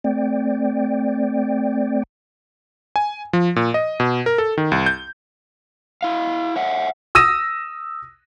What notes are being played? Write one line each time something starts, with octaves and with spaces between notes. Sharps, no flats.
A3 C4 D5 G5
G#5
F3
A#2
D#5
B2
A#4
A4
D#3
C2
G6
E4 F5
C#5 E5 F#5
D#6 E6 A#6 D#7